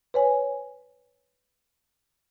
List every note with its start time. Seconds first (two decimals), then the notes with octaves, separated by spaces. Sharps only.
0.14 B4 C#5 G#5